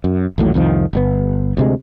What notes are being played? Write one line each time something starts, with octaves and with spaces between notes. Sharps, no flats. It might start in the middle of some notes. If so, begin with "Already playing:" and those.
F#2
A1 D#2 A2 F#3
C2 F2 D#3 F3
G1 D3 B3
D2 C3 G#3